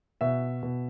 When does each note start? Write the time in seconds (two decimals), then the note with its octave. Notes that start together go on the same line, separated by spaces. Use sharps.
0.21 B2 E5
0.63 B2